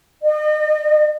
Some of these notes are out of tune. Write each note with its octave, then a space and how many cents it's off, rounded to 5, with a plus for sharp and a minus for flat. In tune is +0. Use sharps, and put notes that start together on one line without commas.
D#5 -40